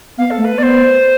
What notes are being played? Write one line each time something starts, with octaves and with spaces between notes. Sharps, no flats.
B3 F5
A4
A3
B4
B3 C5 D5